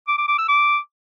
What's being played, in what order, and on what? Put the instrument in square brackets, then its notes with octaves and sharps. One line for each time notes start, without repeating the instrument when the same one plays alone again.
[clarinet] D6
D6
D6
E6
D6